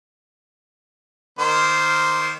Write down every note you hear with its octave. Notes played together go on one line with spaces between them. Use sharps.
D#3 A#3 C5